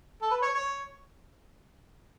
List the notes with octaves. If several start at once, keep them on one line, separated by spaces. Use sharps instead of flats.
A4
B4
C#5
C#5